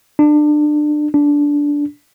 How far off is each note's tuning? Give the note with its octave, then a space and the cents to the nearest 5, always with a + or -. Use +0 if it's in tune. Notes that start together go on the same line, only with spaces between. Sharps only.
D4 +25
D4 -15